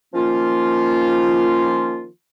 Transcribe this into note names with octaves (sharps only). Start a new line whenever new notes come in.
D#3 F3 A#3 C#4 F4